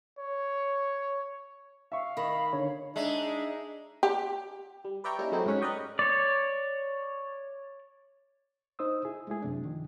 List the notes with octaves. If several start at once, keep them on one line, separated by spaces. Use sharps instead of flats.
C#5
E5 F5 C#6
D#3 B5
D3 C#5
G#3 D4 D#4 E5
G4
G3
B4 D5 E5 G5 A#5 C#6
G3 A#3 C#4 D#4 E4 G#4
F#3 G#3 A3 C4 D#4 E4
G#2 C#3 C#4 F#5 B6
A#4 B4 D5 D#5 G5 C#6
C#5 D5
D#4 C5 D#6 E6
E4 G#4
G#3 A3 E4 G#4
F#2 C3 D4
D#3 F3